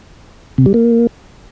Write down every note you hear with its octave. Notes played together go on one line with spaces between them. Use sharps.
C3
G3
A#3